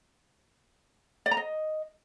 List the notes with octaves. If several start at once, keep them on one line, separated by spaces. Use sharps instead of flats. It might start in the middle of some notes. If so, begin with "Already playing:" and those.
D5
A#5
D#5